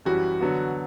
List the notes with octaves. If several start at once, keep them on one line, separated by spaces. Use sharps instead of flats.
F#2 E3 G3 F#4
D3 F#3 B3